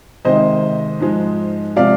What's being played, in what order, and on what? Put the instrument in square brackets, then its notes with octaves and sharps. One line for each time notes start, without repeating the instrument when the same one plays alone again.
[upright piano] C3 D#3 G#3 C5 D#5
G#2 F3 G#3
C3 F3 G#3 D5 F5